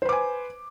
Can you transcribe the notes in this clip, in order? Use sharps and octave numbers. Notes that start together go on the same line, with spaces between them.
B4 C5 G#5 D6